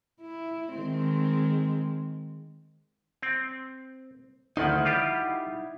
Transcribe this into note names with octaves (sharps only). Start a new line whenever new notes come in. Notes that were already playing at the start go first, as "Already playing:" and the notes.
E4
D#3 G#3 C4
C4
D2 D#3 F3 D#4 E4 F#5
G3 F4 G4